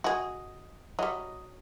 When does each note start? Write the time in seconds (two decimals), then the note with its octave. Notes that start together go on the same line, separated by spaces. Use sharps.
0.04 F#4 G#4 D#5
0.99 F#3 G3 D#5